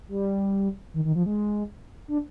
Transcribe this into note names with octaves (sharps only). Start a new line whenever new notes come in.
G3
D#3
D#3
F3
G#3
D4